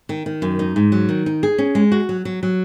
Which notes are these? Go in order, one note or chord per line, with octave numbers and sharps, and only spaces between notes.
D#3
D#3
F#2
D#4
G#2
F#3
D#3
D#4
G#4
C#4
G#3
F#4
F#3
F#3
F#3